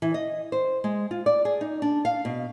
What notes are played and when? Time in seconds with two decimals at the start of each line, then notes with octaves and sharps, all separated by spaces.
0.02 E3
0.14 D#5
0.52 C5
0.84 G#3
1.11 F4
1.26 D5
1.45 G#4
1.61 D#4
1.82 D4
2.05 F5
2.25 B2